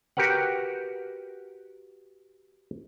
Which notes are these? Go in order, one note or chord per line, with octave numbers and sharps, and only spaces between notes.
F#4 G4 A#4 B4 F#5